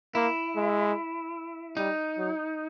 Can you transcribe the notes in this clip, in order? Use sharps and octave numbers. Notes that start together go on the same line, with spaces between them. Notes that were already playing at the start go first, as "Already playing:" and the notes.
A#3 E4
G#3
G3 D#4
F#3